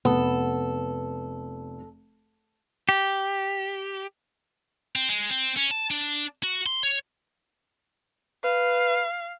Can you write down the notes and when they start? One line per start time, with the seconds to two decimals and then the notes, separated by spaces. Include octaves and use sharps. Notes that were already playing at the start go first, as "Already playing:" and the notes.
0.05 F1 B3 A4
2.89 G4
4.96 C4
5.09 G#3
5.29 C4
5.57 C#4
5.71 A5
5.91 D4
6.43 F#4
6.66 C6
6.83 C#5
8.44 B4 F5